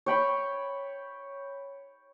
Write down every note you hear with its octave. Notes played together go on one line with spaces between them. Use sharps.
C#5 G5 B5 C#6